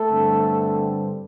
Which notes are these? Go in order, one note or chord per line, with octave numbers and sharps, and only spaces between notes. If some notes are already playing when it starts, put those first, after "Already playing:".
Already playing: A3 A4
G2 D3 G3 C4